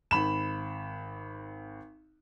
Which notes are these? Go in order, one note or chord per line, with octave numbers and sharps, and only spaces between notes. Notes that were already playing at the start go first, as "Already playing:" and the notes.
G#1 B5 E7